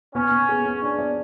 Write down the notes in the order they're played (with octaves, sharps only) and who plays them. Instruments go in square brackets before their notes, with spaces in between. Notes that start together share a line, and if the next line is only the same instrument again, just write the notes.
[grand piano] B3 [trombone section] C#4
[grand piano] B3
G#4
B3
D4
D5